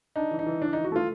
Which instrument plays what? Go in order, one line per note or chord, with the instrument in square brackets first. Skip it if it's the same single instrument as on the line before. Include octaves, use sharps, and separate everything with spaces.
[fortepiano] D4 [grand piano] D#4
[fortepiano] E3
[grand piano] D#4
[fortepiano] E3
[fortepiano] E3 [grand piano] D4
[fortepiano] E3 [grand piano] D#4
[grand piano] F#4
[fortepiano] A3 [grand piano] F4